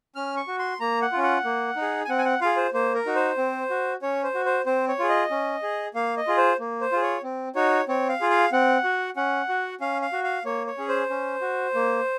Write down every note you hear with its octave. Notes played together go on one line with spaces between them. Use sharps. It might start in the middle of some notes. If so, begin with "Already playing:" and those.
C#4 F6
C#6
F#4
C6
A#3 A#5
F#5
C#4 F4
F#5
A#3
D#4
G#4
G#5
C4 F#5
G#5
F#5
F4 G#4 F5
C5
A#3 C5
A#4
D#4 F#4
C5
C4
F#4
C#4 C#5
C5
F#4
C5
C4 C5
C#5
F4 G#4
D#5
C#4
G#4
A#3 F5
D#5
F4 G#4
C5
A#3
C5
F4 G#4
C#5
C4
D#4 F#4 C#5
C4 C#5
F5
F4 G#4
F5
C4 F#5
F#4
C#4 F#5
F#4
C#4 F5
F5
F#4
F5
A#3 C#5
C#5
C#4 G#4
C5
C#4
F#4
A#3